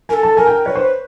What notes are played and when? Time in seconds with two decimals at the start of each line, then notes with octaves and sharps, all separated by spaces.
0.09 A#4 G#5
0.13 A4
0.23 A5
0.37 A#4 G#5
0.47 G5
0.65 B4 C#5
0.75 C5